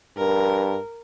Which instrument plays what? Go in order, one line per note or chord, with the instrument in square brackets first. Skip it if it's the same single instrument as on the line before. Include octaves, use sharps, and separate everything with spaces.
[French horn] G2 [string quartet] A#4